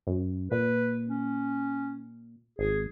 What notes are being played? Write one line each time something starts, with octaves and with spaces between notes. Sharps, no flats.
F#2
A#2 B4
C#4
G#1 G#4